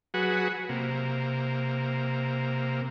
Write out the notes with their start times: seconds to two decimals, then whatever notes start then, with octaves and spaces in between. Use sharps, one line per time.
0.14 F#3 F#4 G#4 B4
0.69 C3 A#3